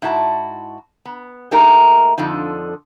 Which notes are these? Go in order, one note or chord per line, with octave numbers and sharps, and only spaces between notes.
G#2 E4 F#4 A4 A5
B3
A3 A#3 D#4 G4 G#4 A#4
F2 D3 F3 D#4